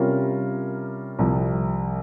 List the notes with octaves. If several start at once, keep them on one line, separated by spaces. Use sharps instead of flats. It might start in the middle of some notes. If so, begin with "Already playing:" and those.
Already playing: C3 G3 C#4 F4 A#4
C2 C3 F3